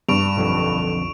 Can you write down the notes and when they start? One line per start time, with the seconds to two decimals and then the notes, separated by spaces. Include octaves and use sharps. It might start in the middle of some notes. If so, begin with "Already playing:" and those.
0.09 G2 C#6 D7 F7
0.36 B1 F2 D3